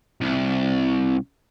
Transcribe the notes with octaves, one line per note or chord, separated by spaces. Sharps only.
C2